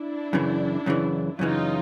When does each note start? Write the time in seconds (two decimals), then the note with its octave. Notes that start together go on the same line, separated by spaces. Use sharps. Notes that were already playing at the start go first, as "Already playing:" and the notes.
Already playing: D4 E4
0.33 F#2 C#3 E3
0.86 F#2 C#3 E3
1.39 F#2 C#3 E3 D#4 F4